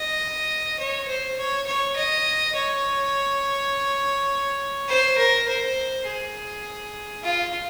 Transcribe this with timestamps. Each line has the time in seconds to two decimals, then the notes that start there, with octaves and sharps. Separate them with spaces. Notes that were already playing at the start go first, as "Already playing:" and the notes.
Already playing: D#5
0.79 C#5
1.08 C5
1.38 C#5
1.66 C#5
1.96 D#5
2.55 C#5
4.88 C5
5.18 A#4
5.48 C5
6.07 G#4
7.23 F4